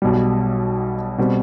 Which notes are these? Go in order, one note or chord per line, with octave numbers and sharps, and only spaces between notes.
B1 B2 G3
B2 G3 C4